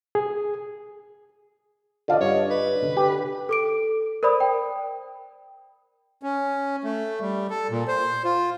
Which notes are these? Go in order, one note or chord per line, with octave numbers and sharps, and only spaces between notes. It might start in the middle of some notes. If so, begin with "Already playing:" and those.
G#4
D3 F4 D5 D#5 F5
G2 C#5
B4
D3
G4
A4 D6 D7
A#4 C5 D5 B5 D#6
G5
C#4
A3
G3
A4
A#2
C5
F4